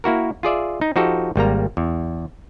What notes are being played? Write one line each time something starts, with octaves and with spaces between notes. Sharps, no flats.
A#3 E4 F#4 A#4
F4 G#4 D5 E5
D#4
F3 D#4 F#4 G4 A4
G#1 G3 A#3 A#5
E2